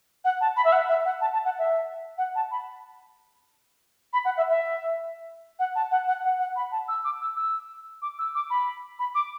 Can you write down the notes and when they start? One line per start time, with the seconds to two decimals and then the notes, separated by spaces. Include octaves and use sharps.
0.25 F#5
0.41 A5
0.56 B5
0.65 E5
0.72 F#5
0.88 E5
1.05 F#5
1.21 A5
1.33 A5
1.45 F#5
1.58 E5
2.18 F#5
2.35 A5
2.51 B5
4.13 B5
4.25 F#5
4.37 E5
4.50 E5
5.59 F#5
5.75 A5
5.91 F#5
6.08 F#5
6.24 F#5
6.39 F#5
6.56 B5
6.72 A5
6.88 E6
7.04 D6
7.21 E6
7.37 E6
8.02 D6
8.19 E6
8.35 D6
8.50 B5
8.99 B5
9.15 D6